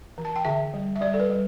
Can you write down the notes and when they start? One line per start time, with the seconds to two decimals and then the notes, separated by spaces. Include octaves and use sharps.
0.18 E3
0.25 A5
0.36 G5
0.45 D3 E5
0.74 G3
0.96 E5
1.01 G3 D5
1.14 A4
1.20 B4
1.30 G3